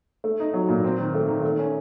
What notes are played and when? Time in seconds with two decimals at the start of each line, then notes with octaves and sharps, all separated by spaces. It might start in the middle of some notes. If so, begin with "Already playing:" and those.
0.24 A3
0.40 D#4
0.54 F#3
0.69 A#2
0.84 C4
0.99 D#3
1.14 A3
1.28 D#3
1.43 A3
1.59 C#4